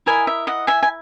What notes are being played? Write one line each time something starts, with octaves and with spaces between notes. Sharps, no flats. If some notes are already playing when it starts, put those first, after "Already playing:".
E4 A#4 D#5 E5 G#5
E5
D#5 F#5
E5 G#5
G#5